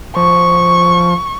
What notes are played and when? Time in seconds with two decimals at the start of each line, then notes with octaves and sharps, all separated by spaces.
0.16 F3 C#6